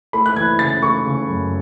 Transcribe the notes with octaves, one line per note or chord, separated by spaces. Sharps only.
A3 B5
F#6
E3 G#6
C#3 A6
A3 C#6
C#3
F#2